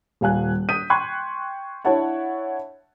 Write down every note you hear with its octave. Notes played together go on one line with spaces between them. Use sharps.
D#1 G3 F5 G#5 F#6
D#6 G6 B6 D#7
G5 C6 C#6 F#6 G#6
D4 E4 C#5 E5 F#5 A5